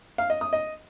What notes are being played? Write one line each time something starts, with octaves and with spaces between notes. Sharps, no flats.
F5
D#5
D#6
D#5